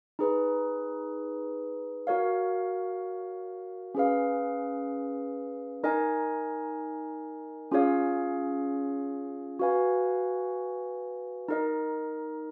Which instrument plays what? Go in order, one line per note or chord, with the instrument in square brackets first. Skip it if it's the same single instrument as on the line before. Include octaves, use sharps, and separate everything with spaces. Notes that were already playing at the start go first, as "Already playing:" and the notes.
[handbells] D#4 G#4 B4
F#4 A#4 C#5 F5
C#4 G#4 B4 F5
D#4 A#4 D#5 G#5
C#4 F4 G#4 C#5 F5
F#4 B4 F5 G#5
D#4 A#4 D#5